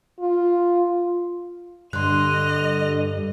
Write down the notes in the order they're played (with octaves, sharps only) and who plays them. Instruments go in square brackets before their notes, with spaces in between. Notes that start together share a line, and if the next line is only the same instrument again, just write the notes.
[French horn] F4
[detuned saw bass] G2 [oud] D3 [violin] D#5 F7 [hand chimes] C6 F#6